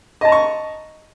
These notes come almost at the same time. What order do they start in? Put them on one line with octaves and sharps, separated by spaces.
D#5 A5 A#5 C#6